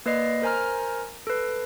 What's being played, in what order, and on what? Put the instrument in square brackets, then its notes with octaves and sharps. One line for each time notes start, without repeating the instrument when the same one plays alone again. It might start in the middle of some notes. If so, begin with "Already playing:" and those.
[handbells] A#3 B4 D5 D#5 C7
A#4 C5 G#5 A#5 F6
A4 B4